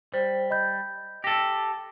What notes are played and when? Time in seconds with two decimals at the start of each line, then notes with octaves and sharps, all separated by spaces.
0.14 G3 C5
0.50 D#5 B5 G6
1.24 G4 A4 A#6